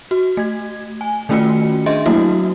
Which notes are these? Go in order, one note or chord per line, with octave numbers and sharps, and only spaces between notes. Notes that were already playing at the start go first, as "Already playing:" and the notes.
F#4
A3 G#6
G#5
D#3 A3 C#4 F4 F#4 C#7
D4 G#4 D#5 E5 C6
F#3 A3 A#3 E4 F#4